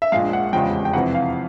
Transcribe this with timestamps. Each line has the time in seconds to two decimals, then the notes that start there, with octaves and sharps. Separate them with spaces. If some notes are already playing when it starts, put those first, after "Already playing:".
0.02 E5
0.12 A#1 A#2 F3 G#3 F5
0.33 F#5
0.53 F1 E2 C#3 F3 G#3 G5
0.85 G5
0.93 F2 C3 E3 F#5
1.15 F5